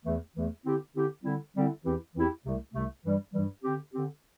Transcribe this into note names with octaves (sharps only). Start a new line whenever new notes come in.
E2 E3 A3
E2 E3 A3
D3 C4 E4 G4
D3 C4 E4 G4
D3 G3 C4 E4
D3 G3 C4 E4
E2 E3 C4 E4 G4
E2 E3 C4 E4 G4
C2 C3 A3
C2 C3 A3
G2 E3 G3
G2 E3 G3
D3 C4 G4
D3 C4 G4